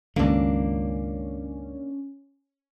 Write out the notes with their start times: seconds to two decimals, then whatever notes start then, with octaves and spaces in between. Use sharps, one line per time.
0.16 C#2 G2 D#3 A#3 C#4 D4